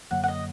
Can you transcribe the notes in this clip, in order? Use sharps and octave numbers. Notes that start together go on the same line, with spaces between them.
F#2 D3 F#3 A#3 F#5
F#5
D#5